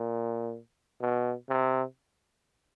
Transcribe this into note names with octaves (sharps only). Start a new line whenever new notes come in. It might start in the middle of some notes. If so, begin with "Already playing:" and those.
Already playing: A#2
B2
C3